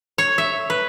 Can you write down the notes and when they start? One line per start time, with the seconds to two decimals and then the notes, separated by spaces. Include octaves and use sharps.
0.18 C#5
0.38 E5
0.70 B4